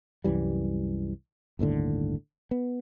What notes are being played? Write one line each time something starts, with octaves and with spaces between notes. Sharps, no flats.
C2 F#2 E3 G3
G1 D#2 A2 D3
B3